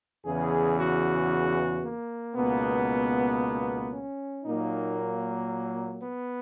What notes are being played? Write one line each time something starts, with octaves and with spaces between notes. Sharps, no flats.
E2 C#3 E3 G#4
F#4
A#3
C#2 B2 A#3 B3
C#4
A#2 F#3 A#3 D#4
B3